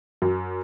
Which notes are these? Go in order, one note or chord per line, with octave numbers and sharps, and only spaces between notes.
F#2